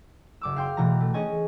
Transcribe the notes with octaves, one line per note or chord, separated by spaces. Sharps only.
F#1 D6 E6
F5 G5 C6
B2 E3 A3 A#5
A3
C#4 G#4 D#5 G#5 C#6